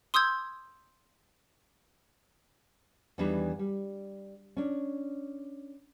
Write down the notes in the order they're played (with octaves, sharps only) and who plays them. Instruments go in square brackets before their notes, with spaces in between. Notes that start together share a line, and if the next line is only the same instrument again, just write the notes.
[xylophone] C6 D#6 E6 G6 G#6
[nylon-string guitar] E2 D#3 E3 G3 D4 D#4
G3
C#4 D4